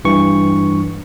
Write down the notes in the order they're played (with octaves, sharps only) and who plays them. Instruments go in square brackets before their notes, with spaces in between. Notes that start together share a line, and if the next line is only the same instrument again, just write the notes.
[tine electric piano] G2 E3 C#6